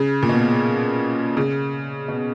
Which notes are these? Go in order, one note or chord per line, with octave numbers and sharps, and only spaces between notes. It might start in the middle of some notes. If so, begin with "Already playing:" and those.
Already playing: C#3
A#2
B2
C#3
B2